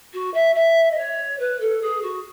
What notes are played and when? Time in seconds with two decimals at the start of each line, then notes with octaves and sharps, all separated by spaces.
0.13 F#4
0.34 E5
0.55 E5
0.91 D#5
0.97 C#5
1.39 B4
1.60 A4
1.81 G#4
2.02 F#4